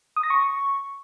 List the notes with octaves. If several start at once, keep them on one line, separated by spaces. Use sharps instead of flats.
D#6
A#6
C#6